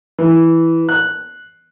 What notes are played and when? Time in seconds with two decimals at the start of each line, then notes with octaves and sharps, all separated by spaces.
0.18 E3
0.89 F#6